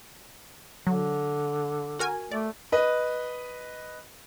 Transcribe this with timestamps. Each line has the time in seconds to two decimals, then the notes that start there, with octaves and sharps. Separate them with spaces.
0.87 D3 F#3
1.99 F#4 A#4 G#5
2.32 A3 D5
2.72 B4 D#5